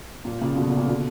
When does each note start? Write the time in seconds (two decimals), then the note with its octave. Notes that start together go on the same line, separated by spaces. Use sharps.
0.25 A#2
0.41 A#2 C#3
0.56 B2 D3
0.67 B2 D3
0.77 A#2 C#3
0.87 B2 D3